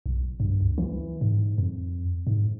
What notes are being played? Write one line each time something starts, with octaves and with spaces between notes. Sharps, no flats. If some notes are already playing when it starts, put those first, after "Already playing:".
B1
G2
C#2
E3
G#2
F2
G#2